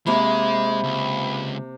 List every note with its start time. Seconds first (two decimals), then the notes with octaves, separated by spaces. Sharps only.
0.06 C3 G#3 A#3 C5 B5
0.84 C#2